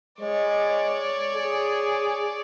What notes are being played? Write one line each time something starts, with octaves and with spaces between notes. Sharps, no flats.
G#3 C#5 D5
G#4